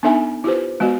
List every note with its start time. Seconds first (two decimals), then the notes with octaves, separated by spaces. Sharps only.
0.03 B3 D4 D#4 A4 E5 G#5
0.44 E4 F4 G4 B4 C5
0.80 G#3 B3 F#4 D#5